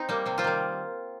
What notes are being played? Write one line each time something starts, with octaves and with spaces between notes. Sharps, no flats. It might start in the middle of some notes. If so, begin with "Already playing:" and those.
Already playing: C4 D#4
G3 A#3
C3 C4
C4 F4
D#3 G3